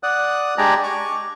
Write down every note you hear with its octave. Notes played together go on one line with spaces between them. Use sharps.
D5 F#5 D#6 F#6
G#3 D4 G4 D5 G#5 A#5
C#6 D6